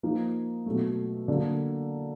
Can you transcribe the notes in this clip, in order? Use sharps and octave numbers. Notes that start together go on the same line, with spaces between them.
F3 A#3 D#4
B2 F#3 A3
D3 F#3 A#3